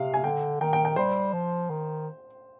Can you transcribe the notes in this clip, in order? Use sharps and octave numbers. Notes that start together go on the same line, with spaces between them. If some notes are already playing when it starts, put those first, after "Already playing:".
Already playing: C3 F5
G#5
D3 G5
D#3 G5
G5
G5
G3 C5
F3
D#3